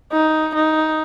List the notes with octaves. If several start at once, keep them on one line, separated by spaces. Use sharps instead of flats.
D#4
D#4